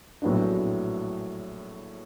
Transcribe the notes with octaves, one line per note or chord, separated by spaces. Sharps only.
A#1 A2 F#3 B3 D4